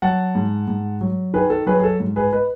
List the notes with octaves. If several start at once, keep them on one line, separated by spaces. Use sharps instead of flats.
F#3 F#5 A5
G#2
G#2
F#3
D#3 G#4 B4
A4
F#3 G#4 B4
G#4
A4
G#2
G#4 B4
B4 D#5